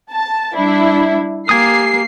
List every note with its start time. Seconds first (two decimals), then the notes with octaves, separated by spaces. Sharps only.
0.12 A5
0.55 G3 D4 E4
1.49 A#3 G4 G#5 D#6 C7